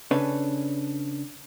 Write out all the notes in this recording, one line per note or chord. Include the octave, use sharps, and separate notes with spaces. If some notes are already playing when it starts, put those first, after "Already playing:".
C#3 C#4 D4 A4 B4 C#5